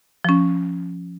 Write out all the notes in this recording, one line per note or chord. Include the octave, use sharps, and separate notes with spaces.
F3 C#4